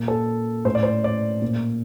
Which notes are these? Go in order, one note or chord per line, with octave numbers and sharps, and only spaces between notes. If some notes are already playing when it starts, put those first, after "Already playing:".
Already playing: A#2
A4
A2 C5
D5
C5
D5
A#2